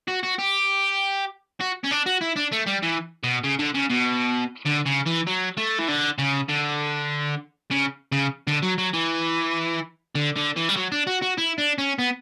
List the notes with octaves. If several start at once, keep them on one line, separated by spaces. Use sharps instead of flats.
F#4
F#4
G4
F#4
C#4
D4
F#4
E4
D4
A3
G3
E3
B2
C#3
D3
C#3
B2
D3
C#3
E3
F#3
A3
E3
D3
C#3
D3
C#3
C#3
D3
F#3
F#3
E3
D3
D3
E3
G3
F#3
D4
F#4
F#4
E4
D4
C#4
B3